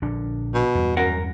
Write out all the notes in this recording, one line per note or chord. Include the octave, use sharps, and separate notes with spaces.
A#1 D3 D4
B2
E2 G2
F#2 A#4 F#5